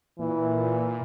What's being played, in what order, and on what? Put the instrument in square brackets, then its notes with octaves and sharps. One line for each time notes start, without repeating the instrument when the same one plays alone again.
[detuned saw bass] A#2 [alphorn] E3